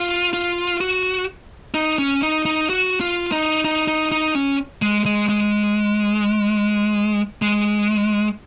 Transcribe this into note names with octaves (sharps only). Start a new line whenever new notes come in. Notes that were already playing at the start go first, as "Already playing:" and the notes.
Already playing: F4
F4
F#4
D#4
C#4
D#4
D#4
F#4
F4
D#4
D#4
D#4
D#4
C#4
G#3
G#3
G#3
G#3